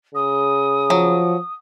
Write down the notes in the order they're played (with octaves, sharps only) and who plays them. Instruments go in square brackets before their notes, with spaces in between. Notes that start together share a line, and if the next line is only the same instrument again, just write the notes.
[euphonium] C#3 [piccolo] D#6
[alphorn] F3 [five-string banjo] F#3